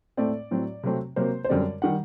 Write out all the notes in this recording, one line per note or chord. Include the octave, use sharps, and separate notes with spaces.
A2 A3 C4 D5
A2 F#3 C4
C3 F#3 A3 C4
C3 F#3 A#3 C5
C5
F#2 D3 G3 C4 D5
D#3 G3 F#5